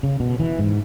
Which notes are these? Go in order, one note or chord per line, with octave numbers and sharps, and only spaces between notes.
C#3
B2
E3
G#2